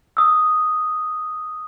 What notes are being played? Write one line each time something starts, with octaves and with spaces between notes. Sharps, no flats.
D#6 E6